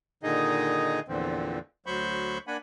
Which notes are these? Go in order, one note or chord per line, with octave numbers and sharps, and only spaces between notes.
A#2 D3 D#3 D#4 G#4 D#5
E2 A#2 D3 E3 F3 C4
D2 F#3 C5 B5 C#6 G6
A#3 D4 F#5 G#5 B5